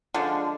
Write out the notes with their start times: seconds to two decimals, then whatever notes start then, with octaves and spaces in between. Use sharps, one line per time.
0.14 D3 F3 G#3